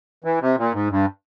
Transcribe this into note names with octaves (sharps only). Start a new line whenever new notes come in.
E3
C3
A#2
G#2
G2